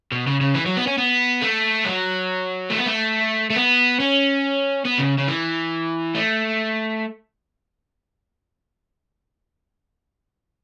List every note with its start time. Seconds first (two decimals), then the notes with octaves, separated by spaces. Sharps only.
0.12 B2
0.27 C#3
0.41 C#3
0.55 E3
0.66 F#3
0.77 B3
0.87 C#4
0.98 B3
1.42 A3
1.85 F#3
2.70 A3
2.78 B3
2.86 A3
3.50 A3
3.56 B3
4.00 C#4
4.85 B3
4.99 C#3
5.19 C#3
5.28 E3
6.15 A3